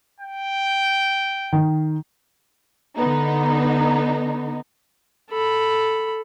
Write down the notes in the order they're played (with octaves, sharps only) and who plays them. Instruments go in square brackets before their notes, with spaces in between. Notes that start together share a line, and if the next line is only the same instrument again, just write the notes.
[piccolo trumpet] G5
[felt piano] D#3
[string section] D3 B3 D#4
[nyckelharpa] A4 B5